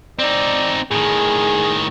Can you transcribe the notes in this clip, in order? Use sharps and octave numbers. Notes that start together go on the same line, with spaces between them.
C4 D#4 D5
A2 D#3 G#4